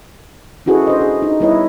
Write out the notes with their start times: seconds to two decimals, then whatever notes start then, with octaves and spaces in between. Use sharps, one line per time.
0.66 C#4 E4 F#4 G#4 A4 B4
0.87 D4 C5 D#5
1.01 G#4
1.22 D#4
1.41 G3 B3 E4 B4 C#5 D#5